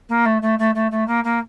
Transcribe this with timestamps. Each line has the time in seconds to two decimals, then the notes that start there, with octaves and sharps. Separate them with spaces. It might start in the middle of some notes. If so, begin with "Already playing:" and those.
0.09 A#3
0.25 A3
0.42 A3
0.59 A3
0.75 A3
0.91 A3
1.07 A#3
1.24 A#3